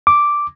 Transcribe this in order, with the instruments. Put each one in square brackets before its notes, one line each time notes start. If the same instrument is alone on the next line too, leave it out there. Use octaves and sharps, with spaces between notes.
[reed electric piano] D6